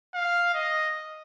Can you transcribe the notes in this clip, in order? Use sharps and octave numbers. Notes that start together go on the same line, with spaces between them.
F5
D#5